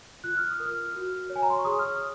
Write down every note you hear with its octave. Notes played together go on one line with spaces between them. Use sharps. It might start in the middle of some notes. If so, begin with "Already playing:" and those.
F4 F#6
F6
D#6
A#4
F6
F#4
C#5
G#5
A#5
C6
C#6
G#4 D#6
F6
D#6